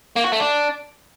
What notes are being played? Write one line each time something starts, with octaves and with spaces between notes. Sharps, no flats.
A#3
F#4
A3
D4